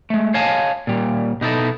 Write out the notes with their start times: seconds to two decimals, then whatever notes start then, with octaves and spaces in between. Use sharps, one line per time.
0.10 G#3 A3
0.34 C#5 D#5 F5 G#5 A5
0.87 A#2 G3
1.41 B2 D#4 E4 A4